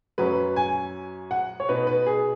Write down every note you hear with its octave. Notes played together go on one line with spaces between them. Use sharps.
F#2 F#3 C#4 B4
G#5
F#5
C#5
B2 B3 D#4 B4
B4
G#4